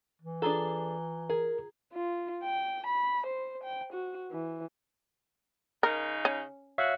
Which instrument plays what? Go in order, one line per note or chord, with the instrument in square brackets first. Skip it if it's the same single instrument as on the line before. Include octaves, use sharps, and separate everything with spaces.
[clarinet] E3
[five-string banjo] D4 G#4 A4 [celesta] F4 A#5 G7
[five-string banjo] G#4 [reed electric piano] A#4
[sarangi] F4
G5
B5
C5
G5
F#4
E3
[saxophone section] C#3 D#4 [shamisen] A#4
[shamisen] C#4
[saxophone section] F#4 [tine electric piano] C#5 E5 F5